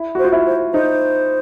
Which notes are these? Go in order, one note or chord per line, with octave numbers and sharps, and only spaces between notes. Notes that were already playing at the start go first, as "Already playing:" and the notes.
Already playing: E4
F#4
C5
F4
E4
C5
D#4 C5